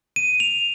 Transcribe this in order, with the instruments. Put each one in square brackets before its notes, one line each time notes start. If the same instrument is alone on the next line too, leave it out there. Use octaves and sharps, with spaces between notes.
[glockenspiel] D#7
F7